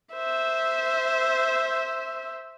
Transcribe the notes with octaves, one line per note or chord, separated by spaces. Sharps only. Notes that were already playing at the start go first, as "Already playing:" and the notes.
C5 E5